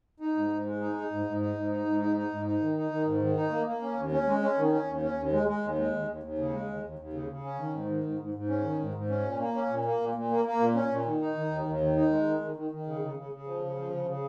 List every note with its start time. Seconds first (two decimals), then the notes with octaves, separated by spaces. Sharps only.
0.20 D#4
0.35 G#2
0.50 G#2
0.65 G#3
0.81 D#4
0.96 D#4
1.11 G#2
1.26 G#2
1.40 D#4
1.56 G#2
1.71 D#4
1.86 G#2
2.00 D#4
2.16 D#4
2.31 G#2
2.46 D#4
2.61 D#3
2.76 D#4
2.91 D#3
3.06 G#2
3.22 D#3
3.36 D#4
3.51 A#3
3.67 A#3
3.82 C#4
3.97 D#2
4.12 C#4
4.27 G#3
4.42 C#4
4.57 D#3
4.72 C#4
4.88 D#2
5.02 C#4
5.17 D#2
5.32 G#3
5.48 G#3
5.63 D#2
5.78 G#3
5.93 D#2
6.08 D#2
6.23 D#2
6.38 C#3
6.53 G#3
6.68 D#2
6.83 D#2
6.99 D#2
7.13 C#3
7.28 C#3
7.44 C#4
7.59 D#3
7.73 G#2
7.88 D#3
8.04 G#2
8.19 G#2
8.34 G#2
8.49 C#4
8.64 D#3
8.79 G#2
8.94 G#2
9.09 C#4
9.24 A#2
9.40 A#3
9.55 C#4
9.70 A#2
9.85 A#3
10.00 A#2
10.15 A#2
10.30 A#3
10.45 A#3
10.60 A#2
10.75 C#4
10.90 A#2
11.05 D#3
11.20 D#4
11.35 D#3
11.51 D#2
11.66 D#2
11.81 D#3
11.96 D#4
12.11 G#3
12.26 D#3
12.41 D#3
12.56 D#3
12.71 D#3
12.86 C#3
13.02 C#3
13.16 C#3
13.32 C#3
13.47 F3
13.62 C#3
13.77 F3
13.92 C#3
14.07 C#3